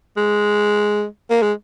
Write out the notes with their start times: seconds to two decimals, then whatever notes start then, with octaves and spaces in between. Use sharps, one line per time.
0.17 G#3
1.30 A#3
1.42 G#3